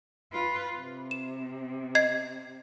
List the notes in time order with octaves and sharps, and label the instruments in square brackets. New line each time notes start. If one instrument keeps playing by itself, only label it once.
[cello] F4 B4
C3
[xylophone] E7
D#5 G#6 C7